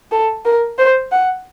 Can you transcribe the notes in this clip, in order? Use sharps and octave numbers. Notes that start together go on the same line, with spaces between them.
A4
A#4
C5
F#5